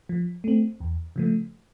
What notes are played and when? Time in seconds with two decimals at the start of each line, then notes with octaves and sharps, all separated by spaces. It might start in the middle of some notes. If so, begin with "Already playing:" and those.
0.09 F3
0.44 A3 C4
0.80 E2
1.16 C#3 F3 A3